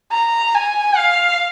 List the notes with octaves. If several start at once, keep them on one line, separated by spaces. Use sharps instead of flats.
A#5
G#5
F5